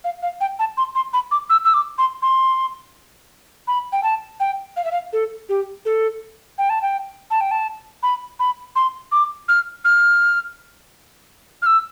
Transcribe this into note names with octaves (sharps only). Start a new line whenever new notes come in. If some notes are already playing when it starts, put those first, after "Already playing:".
F5
F5
G5
A5
C6
C6
B5
D6
E6
E6
D6
C6
C6
B5
G5
A5
G5
F5
E5
F5
A4
G4
A4
G5
A5
G5
A5
G5
A5
B5
B5
C6
D6
F6
F6
F6
E6